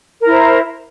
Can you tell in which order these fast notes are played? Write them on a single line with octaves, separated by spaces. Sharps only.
A#4 E4 C5